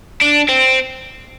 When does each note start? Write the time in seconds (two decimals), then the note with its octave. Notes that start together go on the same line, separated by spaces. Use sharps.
0.21 D4
0.49 C4